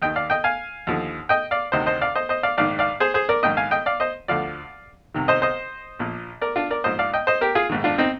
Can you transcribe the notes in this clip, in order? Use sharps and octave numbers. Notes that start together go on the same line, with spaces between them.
D#2 D#3 D#5 G5
D5 F5
D#5 G5
F5 G#5
D#2 D3 F3
D#5 G5
D5 F5
D2 C3 D#3 C5 D#5
C5 D#5
D5 F5
C5 D#5
C5 D#5
D5 F5
A#1 G#2 D#3 D5 F5
D5 F5
G#4 C5
G#4 C5
A#4 D5
A#1 G#2 D#3 D#5 G5
F5 G#5
D#5 G5
D5 F5
C5 D#5
D2 D3 F3 D5 F5
C2 C3 D#3
C5 D#5
C5 D#5
A#1 A#2 F3
A#4 D5
D4 F4
A#4 D5
A#1 G#2 F3 C5 D#5
D5 F5
D#5 G5
C5 D#5
G4 A#4
F4 G#4
A#1 G#2 D#3
D4 F4
C4 D#4